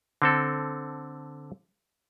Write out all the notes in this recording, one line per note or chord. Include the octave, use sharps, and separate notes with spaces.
D3 C4 A4